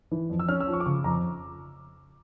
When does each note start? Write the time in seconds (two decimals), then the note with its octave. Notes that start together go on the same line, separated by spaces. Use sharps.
0.12 E3
0.30 F2
0.39 E6
0.48 C#4 F6
0.60 E6
0.67 F3
0.73 C#6
0.80 D6
0.86 C#3 C#6
1.04 F2 A#5